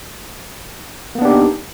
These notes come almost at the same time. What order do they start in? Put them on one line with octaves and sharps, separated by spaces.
A#3 B3 D4 G4 D#4